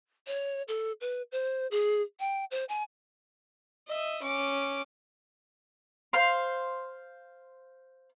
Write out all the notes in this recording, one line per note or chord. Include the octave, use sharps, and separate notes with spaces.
C#5
A4
B4
C5
G#4
G5
C5
G#5
D#5 E5
C#4 D6
C5 F5 C6